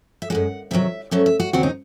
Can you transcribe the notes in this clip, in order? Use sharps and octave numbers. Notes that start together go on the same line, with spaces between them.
E5
F#2 D#3 G#3 F#5
C3 D#3 F#3 E5
G#2 F#3 A3 C#4 E5
E5
F#4
D#2 C#3 F#3 C4 F#4
D#4